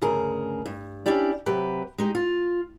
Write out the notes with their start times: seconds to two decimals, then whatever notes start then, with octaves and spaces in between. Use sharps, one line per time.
0.01 D2 G2 C#3 G#4 A#4
0.66 G2
1.06 C#4 D4 E4 G4 D5
1.46 C3 F#3 G4 B4
1.98 G#3 D#4 G4
2.15 F4